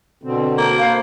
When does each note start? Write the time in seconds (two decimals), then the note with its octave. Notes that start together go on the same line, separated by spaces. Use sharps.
0.23 B2 D3 C4
0.58 A#3
0.79 B4 C5 F5